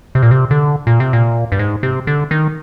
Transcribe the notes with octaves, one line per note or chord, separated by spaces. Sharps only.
C3
A#2
C3
D3
A#2
C3
A#2
G2
G#2
C3
D3
D#3